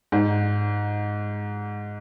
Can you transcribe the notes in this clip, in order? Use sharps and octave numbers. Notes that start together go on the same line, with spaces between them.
G#2